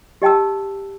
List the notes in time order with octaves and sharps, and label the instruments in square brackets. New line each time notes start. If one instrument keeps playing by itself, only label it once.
[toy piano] G4 D#5 G5 A5 E6